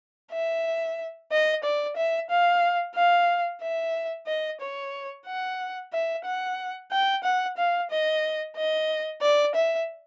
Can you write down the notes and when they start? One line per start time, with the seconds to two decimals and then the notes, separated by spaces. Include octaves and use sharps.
0.32 E5
1.31 D#5
1.64 D5
1.96 E5
2.30 F5
2.95 F5
3.62 E5
4.27 D#5
4.61 C#5
5.27 F#5
5.93 E5
6.25 F#5
6.92 G5
7.24 F#5
7.57 F5
7.91 D#5
8.57 D#5
9.22 D5
9.55 E5